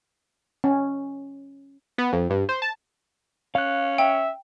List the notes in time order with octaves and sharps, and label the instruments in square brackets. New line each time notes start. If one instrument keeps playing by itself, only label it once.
[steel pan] C#4
[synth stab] B3
F2
G2
C5
A5
[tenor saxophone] C#4 [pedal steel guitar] F5 F#6
[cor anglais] E5 [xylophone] G5